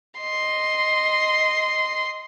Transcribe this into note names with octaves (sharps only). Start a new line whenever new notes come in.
D#5 C6